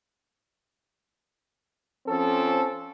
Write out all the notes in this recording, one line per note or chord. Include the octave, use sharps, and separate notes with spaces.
F3 C4 C#4 A4